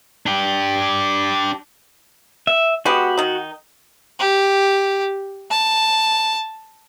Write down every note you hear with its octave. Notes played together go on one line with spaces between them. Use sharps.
D4 G4
E5
G#3 B3 F#4 G4
D#3 D#4
G4
A5